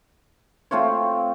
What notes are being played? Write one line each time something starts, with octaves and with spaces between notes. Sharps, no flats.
A3 C4 F4 C#5